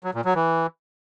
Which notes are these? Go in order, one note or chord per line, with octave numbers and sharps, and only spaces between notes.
F#3
A#2
F#3
E3